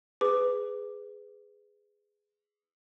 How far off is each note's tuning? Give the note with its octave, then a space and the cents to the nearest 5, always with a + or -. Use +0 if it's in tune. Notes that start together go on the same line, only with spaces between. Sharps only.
G#4 +0 B4 +20 D6 +5